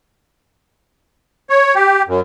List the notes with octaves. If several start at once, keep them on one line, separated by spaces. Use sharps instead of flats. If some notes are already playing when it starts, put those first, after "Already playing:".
C#5
G4
F#2